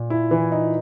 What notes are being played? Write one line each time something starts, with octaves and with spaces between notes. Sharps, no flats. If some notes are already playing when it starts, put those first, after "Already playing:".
Already playing: A#2
E4
E3
D#4